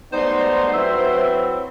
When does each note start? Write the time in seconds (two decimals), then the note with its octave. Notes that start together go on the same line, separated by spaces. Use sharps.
0.12 G#2 G3 A3 B3 D#4 C5 D5
0.74 F#3 C4 E4 B4 E5